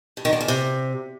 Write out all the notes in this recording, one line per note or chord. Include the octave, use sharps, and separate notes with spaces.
G2
D#3
D3
E2
C3